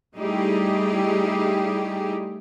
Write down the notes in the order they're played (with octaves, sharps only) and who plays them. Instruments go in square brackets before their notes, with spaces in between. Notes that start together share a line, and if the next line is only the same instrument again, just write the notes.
[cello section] G3 A3 D#4 E4 G4 G#4